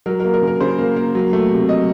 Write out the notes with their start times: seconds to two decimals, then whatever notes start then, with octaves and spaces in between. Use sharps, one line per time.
0.06 F#3 A#4
0.20 A#4
0.24 A#3
0.34 A#4
0.42 C#3
0.47 A#4
0.61 C#3 C5
0.78 A#3
0.96 A#3
1.15 F#3
1.33 A3
1.51 C3
1.69 F#3 D#5